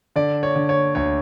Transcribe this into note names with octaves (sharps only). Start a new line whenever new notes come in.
D3 D5
C#5
D3
C#5
D2 C#5